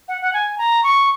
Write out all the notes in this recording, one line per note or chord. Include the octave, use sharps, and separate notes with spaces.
F#5
F#5
G#5
A#5
C#6